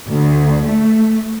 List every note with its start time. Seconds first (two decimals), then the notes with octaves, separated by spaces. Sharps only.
0.10 D2
0.68 A3